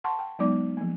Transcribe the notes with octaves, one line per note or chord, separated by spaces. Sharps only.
F#5 A5 C6 C#6
G5
F#3 G#3 B3 D#4 D5 D6
F3 A#3